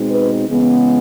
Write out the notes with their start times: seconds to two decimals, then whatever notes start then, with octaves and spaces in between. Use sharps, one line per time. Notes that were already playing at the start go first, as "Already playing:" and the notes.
Already playing: B2 G#3 C4 D#4
0.10 B4
0.47 C#3 E3 G#3 B3